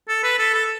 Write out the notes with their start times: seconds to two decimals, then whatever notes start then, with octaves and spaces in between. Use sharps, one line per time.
0.09 A4
0.24 B4
0.39 A4
0.54 A4